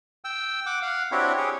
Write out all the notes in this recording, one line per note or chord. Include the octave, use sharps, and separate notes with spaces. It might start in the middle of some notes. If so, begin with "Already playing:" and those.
G5 E6
F#5 D6
F5 F#5
C4 D4 E4 F#4 G4 C#5
G4 G#4 C#5